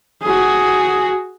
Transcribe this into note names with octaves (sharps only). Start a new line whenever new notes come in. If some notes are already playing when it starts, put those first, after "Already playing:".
F#4 G#4